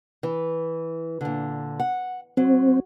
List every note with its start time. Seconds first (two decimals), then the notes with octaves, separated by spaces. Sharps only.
0.23 E3
1.21 A#2 D3
1.80 F#5
2.37 F#3 C4